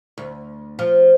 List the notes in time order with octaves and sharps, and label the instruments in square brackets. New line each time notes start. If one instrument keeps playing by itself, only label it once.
[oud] D2
F3